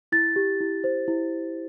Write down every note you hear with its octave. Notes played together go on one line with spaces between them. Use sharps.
E4 A6
G4
E4
C5
E4